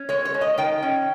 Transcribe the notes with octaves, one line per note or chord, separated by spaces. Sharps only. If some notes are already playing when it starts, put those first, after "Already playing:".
Already playing: C#4
G#3 C#5
C#5
G#3
D#5
D#3 G5
C#4